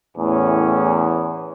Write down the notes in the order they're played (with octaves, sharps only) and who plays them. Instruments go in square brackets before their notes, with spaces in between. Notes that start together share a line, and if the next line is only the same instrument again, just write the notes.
[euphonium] E2 [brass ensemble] A2 C#4